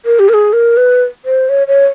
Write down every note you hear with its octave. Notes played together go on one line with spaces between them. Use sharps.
A#4
G4
A#4
G#4
A#4
B4
C5
C#5
C#5